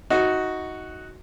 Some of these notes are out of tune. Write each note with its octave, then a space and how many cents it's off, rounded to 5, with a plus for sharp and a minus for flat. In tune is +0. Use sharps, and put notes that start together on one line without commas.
D#4 +20 F#4 +0